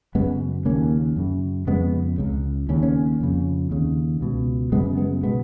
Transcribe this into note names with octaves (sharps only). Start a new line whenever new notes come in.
F#2 C#3 G#3 B3
D#2 C#3 A#3 C#4
F#2 C#3
F2 C#3 G#3 B3
C#2 C#3
D#2 C#3 C#4
A#3 C#4
F2 C#3
D#2 C#3
C#2 B2
F#2 C#3 G#3 B3
G#3 B3
B2 G#3 B3